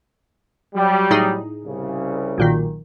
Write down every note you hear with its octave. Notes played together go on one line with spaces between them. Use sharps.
F#3 G3
A2 D#4 G#4
C2 C#3
B1 A#2 D#3